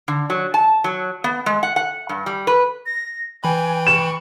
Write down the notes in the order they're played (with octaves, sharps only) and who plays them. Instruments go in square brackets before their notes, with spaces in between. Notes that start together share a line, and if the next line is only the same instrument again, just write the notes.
[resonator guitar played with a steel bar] D3
F#3
A5
F#3
B3
G#3
F#5
F#5
G2
G3
B4
[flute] A#6
[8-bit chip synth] E3 B5 [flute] G5 [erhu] G#5
[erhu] C#6 [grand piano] E7